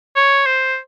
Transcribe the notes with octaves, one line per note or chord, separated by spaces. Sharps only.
C#5
C5